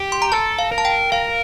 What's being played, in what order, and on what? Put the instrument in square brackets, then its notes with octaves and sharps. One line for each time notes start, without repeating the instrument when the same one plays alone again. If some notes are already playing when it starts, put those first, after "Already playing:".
Already playing: [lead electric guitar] G4
[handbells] C6
A#5
[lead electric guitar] A4 [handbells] A5
[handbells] F5
[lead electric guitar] A#4
[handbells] A5
G5
[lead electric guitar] A#4 [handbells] F5